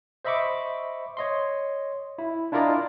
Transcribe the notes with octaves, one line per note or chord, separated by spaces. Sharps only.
C5 D#5 E5 B5 C#6 D6
C#5 D#5 C6
E4
D4 E4 F4 A#4 D5 D#5